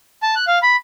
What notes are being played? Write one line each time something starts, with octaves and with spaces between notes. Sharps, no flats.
A5
F#6
F5
B5